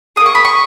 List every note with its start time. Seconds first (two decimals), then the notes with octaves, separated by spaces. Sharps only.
0.16 A#3 E4 G#4 D#6
0.26 C#6
0.35 B5
0.45 C#6